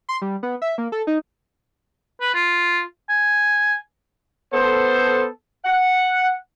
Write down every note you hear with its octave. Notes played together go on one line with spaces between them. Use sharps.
C6
G3
B3
E5
A#3
A4
D#4
B4
F4
G#5
B3 A4 C5
F#5